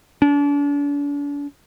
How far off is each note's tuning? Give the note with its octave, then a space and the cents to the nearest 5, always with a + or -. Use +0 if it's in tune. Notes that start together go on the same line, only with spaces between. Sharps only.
D4 -40